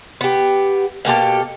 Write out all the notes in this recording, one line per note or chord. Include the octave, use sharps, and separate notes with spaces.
B3 G4
B2 A#3 G4 A4